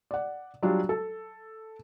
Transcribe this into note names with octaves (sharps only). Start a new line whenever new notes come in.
D5 F#5
F#3 G3 D4 F4
A4